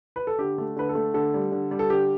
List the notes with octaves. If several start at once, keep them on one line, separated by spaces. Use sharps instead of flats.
B4
A4
D3 G4
A3
D3 B4
A4
A3
D3 A4
G3
D3
G3
A4
D3 G4